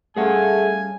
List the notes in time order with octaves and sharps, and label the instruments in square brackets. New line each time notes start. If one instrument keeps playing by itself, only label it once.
[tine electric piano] G3 C#4 F5 [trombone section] A3 [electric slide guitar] G#4 F#5 [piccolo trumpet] G#5